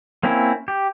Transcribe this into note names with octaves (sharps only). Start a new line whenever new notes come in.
A#3 C4 C#4 E4
G4